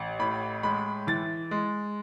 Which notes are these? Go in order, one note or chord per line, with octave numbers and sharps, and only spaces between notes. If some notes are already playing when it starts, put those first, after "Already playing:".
Already playing: A1
A2 B5
G#3 B5
E3 A6
G#3